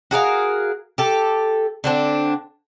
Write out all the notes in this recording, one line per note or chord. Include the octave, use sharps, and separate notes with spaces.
F#4 G#4 A#4 F5
G4 A4
D3 C4 D4